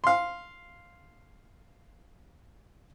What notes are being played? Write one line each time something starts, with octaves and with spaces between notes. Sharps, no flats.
F5 C6